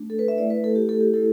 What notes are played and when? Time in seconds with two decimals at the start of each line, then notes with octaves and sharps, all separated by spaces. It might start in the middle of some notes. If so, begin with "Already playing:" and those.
Already playing: A3 D4
0.10 A4
0.19 B4
0.28 E5
0.38 A3 E4 D5
0.50 B4
0.64 A4
0.75 G4
0.89 A4
1.01 G4
1.14 A3 E4 A4